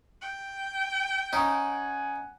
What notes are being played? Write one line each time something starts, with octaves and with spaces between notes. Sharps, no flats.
G5
C#4 D#4 F#5 G#5